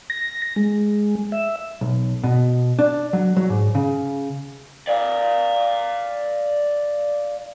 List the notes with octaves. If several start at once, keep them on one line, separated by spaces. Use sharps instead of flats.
A#6
G#3
E5
B1
B2
D4
F#3
F#3
G#2
C#3
D5 F5